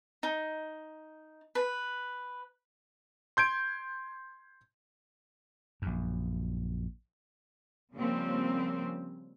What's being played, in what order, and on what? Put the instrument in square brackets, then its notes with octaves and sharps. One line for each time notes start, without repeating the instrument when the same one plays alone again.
[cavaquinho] D#4
B4
[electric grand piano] C6 G6 G#6 D7
[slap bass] A#1 F#2
[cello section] C#3 F3 G3 A#3 C4 C#4